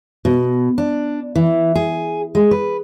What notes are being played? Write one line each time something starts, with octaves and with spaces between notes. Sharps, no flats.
B2
D4
E3
G#4
G#3
B4